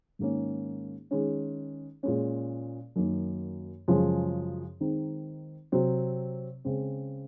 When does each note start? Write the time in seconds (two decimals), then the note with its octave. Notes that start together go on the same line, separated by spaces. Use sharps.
0.19 G#2 D#3 A#3 C#4
1.11 D#3 G#3 C#4
2.03 A#2 G#3 C#4
2.96 F#2 D#3 A#3 D#4
3.88 F#2 C#3 F3 G#3 C#4
4.80 D#3 G#3 C4 D#4
5.72 C3 F#3 C4
6.65 C#3 G#3 C4